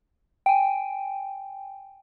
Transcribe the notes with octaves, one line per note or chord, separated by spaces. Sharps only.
G5 G#5